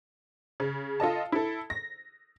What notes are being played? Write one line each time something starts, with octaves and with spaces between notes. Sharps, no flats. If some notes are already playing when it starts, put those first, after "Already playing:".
C#3
F4 A4 D#5 A5
E4 A4
A#6